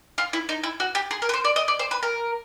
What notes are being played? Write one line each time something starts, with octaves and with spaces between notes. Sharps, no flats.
F4
E4
D#4
E4
F#4
G4
G#4
A#4
B4
C5
D5
D#5
D5
C5
B4
A#4